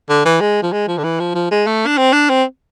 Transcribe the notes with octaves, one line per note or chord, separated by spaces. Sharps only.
D3
E3
G#3
F3
G#3
F3
D3
E3
F3
F3
G#3
A3
D4
C4
D4
C4